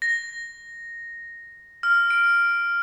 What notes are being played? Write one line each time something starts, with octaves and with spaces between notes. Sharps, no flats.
A#6
F6
D7